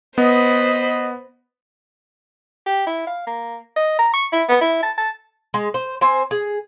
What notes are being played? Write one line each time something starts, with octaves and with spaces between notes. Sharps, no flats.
B3 C5 D#5 B5
G4
E4
F5
A#3
D#5
A#5
C#6
E4
B3
E4
A5
A5
G#3
C5
C4 C5 G#5
G#4